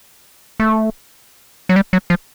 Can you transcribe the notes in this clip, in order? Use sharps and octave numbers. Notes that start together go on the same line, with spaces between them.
A3
F#3
G3
F#3
F3